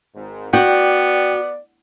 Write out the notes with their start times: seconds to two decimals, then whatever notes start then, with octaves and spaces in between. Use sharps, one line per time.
0.15 G#1 G#2
0.53 B3 F#4 D5 G5